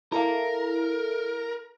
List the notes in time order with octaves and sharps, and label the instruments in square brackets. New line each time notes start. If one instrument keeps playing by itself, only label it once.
[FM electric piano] E4 A4 [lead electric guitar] A#4 [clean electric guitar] F5 A#5